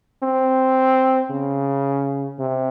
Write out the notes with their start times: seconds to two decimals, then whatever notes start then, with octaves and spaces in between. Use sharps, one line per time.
0.23 C4
1.31 C#3
2.39 C3